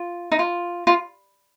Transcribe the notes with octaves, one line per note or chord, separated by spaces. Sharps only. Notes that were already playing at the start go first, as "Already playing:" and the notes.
Already playing: F4
D#4
F4
F4